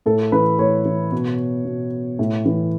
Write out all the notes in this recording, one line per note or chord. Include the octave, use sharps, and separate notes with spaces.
A2 A4
E3 B4
A2 C#5
E3
B2
B2
A2
E3